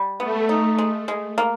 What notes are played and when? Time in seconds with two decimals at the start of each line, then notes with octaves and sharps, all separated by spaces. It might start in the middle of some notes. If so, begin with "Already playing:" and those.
Already playing: G3
0.20 A3 B3
0.49 D#4
0.78 G#3
1.08 G#3
1.38 A#3